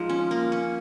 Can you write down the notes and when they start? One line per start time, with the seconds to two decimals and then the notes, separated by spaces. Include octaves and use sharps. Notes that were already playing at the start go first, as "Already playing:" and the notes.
Already playing: F3 G#3 D#4
0.09 C#4
0.31 A#3
0.52 C#4